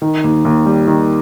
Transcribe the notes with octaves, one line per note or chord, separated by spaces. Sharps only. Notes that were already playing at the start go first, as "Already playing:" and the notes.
D#3
D#2
D#2
G3
D#3